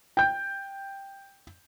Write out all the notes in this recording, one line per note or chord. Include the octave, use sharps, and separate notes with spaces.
G5 G6